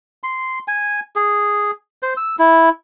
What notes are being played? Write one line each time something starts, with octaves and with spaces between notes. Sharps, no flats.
C6
G#5
G#4
C5
E6
E4